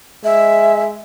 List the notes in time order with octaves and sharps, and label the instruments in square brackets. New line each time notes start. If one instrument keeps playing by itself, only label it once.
[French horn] G#3 [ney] E5